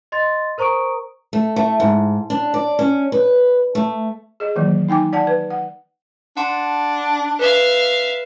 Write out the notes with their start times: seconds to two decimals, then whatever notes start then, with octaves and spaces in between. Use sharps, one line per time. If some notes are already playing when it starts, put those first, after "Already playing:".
0.12 D#5 C6 A6
0.58 A#4 C5 A#5 C#6 D#6 D7
1.33 A3
1.56 A3
1.80 G#2
2.30 D4
2.54 D5
2.79 C#4
3.12 B4
3.75 A3
4.40 G#4 D#5
4.56 D#3 E3 F#3 A#3
4.88 D#4 G5 G#5 D6
5.13 D5 F#5 A5
5.27 B4
5.50 F#5
6.37 D4 F#5 A5 C6
7.39 B4 E5 F5